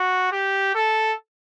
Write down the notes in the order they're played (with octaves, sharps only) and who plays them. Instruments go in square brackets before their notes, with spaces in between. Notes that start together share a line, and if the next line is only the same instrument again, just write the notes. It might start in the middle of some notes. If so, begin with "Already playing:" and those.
Already playing: [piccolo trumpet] F#4
G4
A4